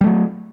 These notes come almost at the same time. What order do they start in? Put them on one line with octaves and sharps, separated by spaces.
G3 A3 F#3